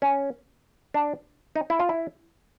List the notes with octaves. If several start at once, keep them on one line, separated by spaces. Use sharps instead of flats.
C#4
D4
D#4
E4
F4
E4